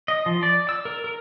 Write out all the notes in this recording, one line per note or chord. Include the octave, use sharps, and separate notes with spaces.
D#5
F3
D5
E6
A#4
A#4